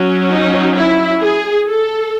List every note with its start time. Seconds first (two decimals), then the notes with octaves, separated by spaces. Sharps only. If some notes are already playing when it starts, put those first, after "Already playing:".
Already playing: F#3 C#4
0.31 D#4
0.76 E4
1.22 G#4
1.67 A4